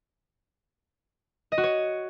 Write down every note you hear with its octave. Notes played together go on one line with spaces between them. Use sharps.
D#5
F#4
C#5